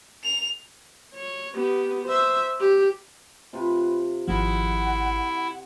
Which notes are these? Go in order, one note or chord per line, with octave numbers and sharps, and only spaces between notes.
F7
C#5
B3 G4
C5 E5
G4
C3 F4 B4
G#1 D#3 F3 E4 F#5